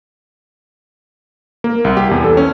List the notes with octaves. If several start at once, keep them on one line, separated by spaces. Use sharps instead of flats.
A#3
C2
G4
E2
A4
C#4